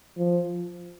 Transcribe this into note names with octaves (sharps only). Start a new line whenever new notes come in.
F3